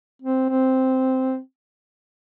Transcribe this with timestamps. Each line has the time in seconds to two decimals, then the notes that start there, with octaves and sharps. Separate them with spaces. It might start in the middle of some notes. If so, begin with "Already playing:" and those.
0.22 C4
0.49 C4